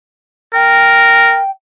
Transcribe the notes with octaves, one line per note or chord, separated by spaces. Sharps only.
A#4 G5